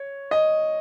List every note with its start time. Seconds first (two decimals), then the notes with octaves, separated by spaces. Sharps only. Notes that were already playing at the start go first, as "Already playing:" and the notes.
Already playing: C#5
0.31 D#5